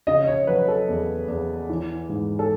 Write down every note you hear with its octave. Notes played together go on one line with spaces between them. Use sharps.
C#3 D#5
C#5
F#3 B4
A4
E2
E2
E3
G#2
A4